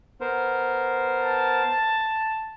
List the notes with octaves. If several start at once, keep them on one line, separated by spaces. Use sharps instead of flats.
B3 A#4 C5
A5